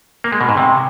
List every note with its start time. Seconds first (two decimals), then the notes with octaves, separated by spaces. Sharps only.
0.24 A#3
0.32 G#3
0.41 B2
0.49 G#2
0.57 C3